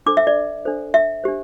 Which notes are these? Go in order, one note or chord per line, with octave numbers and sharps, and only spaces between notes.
D4 A4 C5 D6
E5
D5
D4 A4 C5
E5
D4 G4 C5